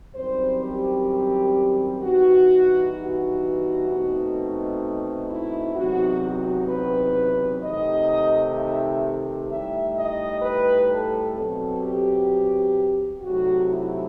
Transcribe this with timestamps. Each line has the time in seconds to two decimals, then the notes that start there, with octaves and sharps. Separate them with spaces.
0.14 F#2 D#3 G3 C4 C5
0.62 G4
2.01 G2 E3 B3 D#4 F#4
2.94 F#4
3.88 B2 A3 C4 D#4
5.29 E4
5.74 E2 C3 F#3 C4 D#4 F#4
6.22 F#4
6.68 B4
7.62 C3 D#3 A3 D#4 D#5
8.55 E5
9.48 A2 G3 D#4 E5
9.94 D#5
10.41 B4
10.88 A4
11.35 B2 F#3 C4 A4
11.82 G4
13.22 C3 F#3 A3 D#4 F#4
13.69 E4